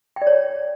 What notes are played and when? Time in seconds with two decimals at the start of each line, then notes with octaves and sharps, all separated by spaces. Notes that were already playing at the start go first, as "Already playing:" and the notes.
0.16 G5
0.22 D5
0.27 C#5